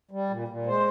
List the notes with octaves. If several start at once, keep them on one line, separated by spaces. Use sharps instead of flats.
G3
A#2
A#2
G#3 C5